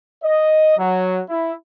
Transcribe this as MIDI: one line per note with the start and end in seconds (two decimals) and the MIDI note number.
0.24 0.75 75
0.78 1.21 54
1.29 1.54 64